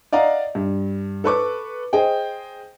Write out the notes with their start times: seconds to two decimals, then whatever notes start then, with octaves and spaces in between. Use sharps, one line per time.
0.13 D5 D#5 F5 F#5 A#5
0.55 G2
1.24 A4 B4 C#6 D6
1.93 G#4 C5 D#5 G5